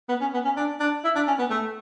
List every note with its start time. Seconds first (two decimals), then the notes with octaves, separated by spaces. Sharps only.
0.09 B3
0.21 C#4
0.34 B3
0.45 C#4
0.57 D4
0.80 D4
1.04 E4
1.16 D4
1.27 C#4
1.39 B3
1.50 A3